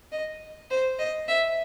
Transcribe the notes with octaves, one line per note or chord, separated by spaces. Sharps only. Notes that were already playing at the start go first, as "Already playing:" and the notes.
D#5
C5
D#5
E5